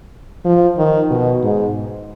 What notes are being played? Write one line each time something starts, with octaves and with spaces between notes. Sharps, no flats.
F3
D#3
B2
G#2